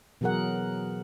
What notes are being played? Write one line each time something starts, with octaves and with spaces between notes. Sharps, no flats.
B2 E3 F#3 G#4 A#4 F#5